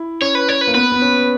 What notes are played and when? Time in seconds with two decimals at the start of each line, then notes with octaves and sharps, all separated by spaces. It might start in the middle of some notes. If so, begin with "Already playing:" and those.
Already playing: E4
0.21 C#4 C#5
0.35 B4
0.49 C#5
0.61 B4
0.67 A#3
0.74 B3 B4
0.92 B3
1.02 C#4